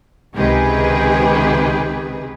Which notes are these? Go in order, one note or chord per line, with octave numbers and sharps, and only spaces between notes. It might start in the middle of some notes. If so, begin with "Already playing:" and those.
C#2 C3 D#3 G4 G#4 B4